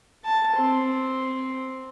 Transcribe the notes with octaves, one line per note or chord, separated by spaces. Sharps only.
A5
C4